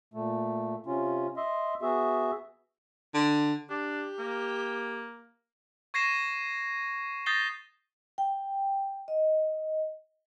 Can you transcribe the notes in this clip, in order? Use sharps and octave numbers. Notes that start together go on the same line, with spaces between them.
A#2 A3
C3 C#4 F4
D#5 E5 C6
B3 F#4 G#4 E5
D3
D4 G4
A#3
C#6 G#6 A#6 C7 D#7 E7
D#6 G6 A6 A#6 C7 G7
G5
D#5